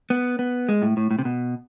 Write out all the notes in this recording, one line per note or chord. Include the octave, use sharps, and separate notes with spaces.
B3
B3
G#3
A2
A2
A2
C3
B2